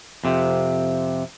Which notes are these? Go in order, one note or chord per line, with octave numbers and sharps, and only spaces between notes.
F2 C3